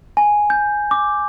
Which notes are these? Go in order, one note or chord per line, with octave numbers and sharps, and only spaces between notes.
G#5
G6
D6